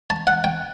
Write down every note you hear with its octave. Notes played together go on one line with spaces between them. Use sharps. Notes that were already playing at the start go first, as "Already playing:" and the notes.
A5
F#5
G5